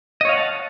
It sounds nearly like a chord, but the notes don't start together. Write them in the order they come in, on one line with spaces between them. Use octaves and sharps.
D#5 C#5 F5 F#5 A5